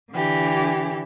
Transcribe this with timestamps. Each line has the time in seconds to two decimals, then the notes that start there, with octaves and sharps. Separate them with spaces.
0.11 D3 E3 G4